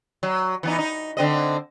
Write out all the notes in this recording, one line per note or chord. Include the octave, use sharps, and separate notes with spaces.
F#3
E3 B3 D#4
D#4
D3 C4 D#5